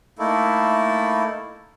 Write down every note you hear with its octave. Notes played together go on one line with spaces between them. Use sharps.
A3 A#3 D#4 E4 A4